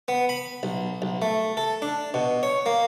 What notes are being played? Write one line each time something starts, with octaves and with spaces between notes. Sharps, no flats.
B3
B5
B1
B1
A3
A4
D4
B2
C#5
A#3